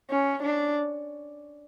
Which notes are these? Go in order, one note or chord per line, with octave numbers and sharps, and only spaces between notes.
C#4
D4